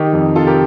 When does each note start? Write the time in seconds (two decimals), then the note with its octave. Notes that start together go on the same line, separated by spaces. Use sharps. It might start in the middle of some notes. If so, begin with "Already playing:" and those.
Already playing: D#3 D#4 G4
0.13 F2
0.36 C3 F4 A4
0.47 G4 A#4